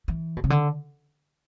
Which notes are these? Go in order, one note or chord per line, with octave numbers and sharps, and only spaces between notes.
E3
B2
C#3
D3